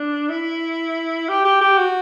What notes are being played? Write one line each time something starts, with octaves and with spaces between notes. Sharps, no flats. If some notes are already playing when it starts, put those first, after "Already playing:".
Already playing: D4
E4
G4
G4
G4
F#4